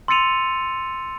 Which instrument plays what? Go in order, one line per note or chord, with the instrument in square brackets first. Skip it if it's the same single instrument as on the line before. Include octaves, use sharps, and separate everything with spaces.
[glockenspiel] C6 E6 A6 C#7 D#7 F7